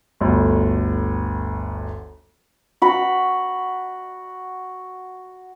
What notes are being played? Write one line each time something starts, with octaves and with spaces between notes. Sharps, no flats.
G1 D2
F#4 B5